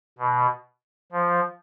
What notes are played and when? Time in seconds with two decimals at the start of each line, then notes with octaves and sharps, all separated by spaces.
0.19 B2
1.12 F3